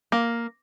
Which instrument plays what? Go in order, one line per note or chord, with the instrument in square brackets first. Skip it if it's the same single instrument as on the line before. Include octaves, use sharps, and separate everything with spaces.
[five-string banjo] A#3